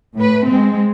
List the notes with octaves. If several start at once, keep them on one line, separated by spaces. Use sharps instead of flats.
A2 B4
G#3 C4